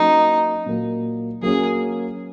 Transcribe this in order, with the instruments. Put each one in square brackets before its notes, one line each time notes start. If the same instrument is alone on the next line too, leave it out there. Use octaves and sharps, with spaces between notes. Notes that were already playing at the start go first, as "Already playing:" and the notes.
Already playing: [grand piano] F#3 A#3 C#4 [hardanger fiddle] D#4
[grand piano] A#2 F#3 A#3
[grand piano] F#3 A#3 C#4 [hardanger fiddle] G#4